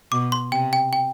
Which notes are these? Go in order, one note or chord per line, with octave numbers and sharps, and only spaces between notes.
B2 D6
C6
C3 G5
G5
G5